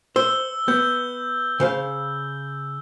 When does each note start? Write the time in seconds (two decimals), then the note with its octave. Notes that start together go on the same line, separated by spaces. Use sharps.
0.16 C5 E6 G7
0.68 B3 G6
1.60 C#3 C5 F5